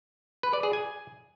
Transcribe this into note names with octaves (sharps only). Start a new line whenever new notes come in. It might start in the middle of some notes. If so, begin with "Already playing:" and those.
B4
D5
G#4
G#5